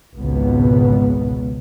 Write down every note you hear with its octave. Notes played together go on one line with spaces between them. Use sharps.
G#1 C#2 B2 B3